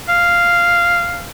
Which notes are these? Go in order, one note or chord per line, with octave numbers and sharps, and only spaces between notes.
F5